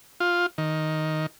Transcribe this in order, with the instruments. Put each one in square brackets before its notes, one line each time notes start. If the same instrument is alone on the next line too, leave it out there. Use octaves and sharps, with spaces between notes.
[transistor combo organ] F4
D#3